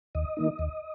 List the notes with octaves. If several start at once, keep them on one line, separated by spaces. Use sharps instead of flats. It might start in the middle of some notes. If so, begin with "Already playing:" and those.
D#2 D#5
D#3 A#3 D#4
D#2